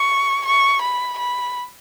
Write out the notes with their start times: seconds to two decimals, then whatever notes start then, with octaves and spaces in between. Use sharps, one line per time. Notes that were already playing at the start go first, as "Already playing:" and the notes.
Already playing: C#6
0.46 C#6
0.82 B5
1.19 B5